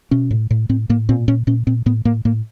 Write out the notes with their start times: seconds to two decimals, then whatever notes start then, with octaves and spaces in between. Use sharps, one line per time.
0.11 B2 C#4
0.31 A2
0.51 A2
0.69 A2 C4
0.89 A2 A#3
1.09 A#2 C4
1.28 A#2 C#4
1.47 A#2 C#4
1.67 A#2 C4
1.86 A2 B3
2.05 A2 A#3
2.25 A2 A#3